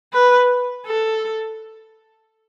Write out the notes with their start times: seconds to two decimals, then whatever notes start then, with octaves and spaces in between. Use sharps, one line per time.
0.13 B4
0.86 A4